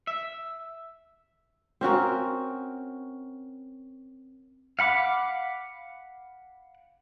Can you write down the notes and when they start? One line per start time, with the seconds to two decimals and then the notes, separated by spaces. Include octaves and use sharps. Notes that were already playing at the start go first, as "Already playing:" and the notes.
0.07 E5
1.81 C4 C#4 F#4 A#4
4.79 F5 F#5 B5 D6